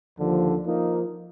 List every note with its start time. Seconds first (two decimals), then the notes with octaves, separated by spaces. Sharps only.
0.19 D#2 D3 F3
0.66 F3 A#3 D#4